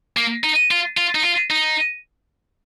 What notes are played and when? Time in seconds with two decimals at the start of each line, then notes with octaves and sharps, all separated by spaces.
0.17 A#3
0.44 D#4
0.71 F4
0.97 F4
1.15 D#4
1.23 F4
1.50 D#4